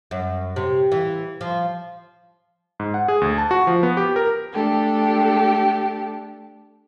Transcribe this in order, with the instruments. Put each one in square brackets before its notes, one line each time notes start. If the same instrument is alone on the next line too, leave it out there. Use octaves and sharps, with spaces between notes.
[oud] F#2
C3
E3
F3
[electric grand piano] G#2
F#5
G#4
D2
A5
F#4
F3
B3
G4
A#4
[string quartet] A3 D4 G4 A4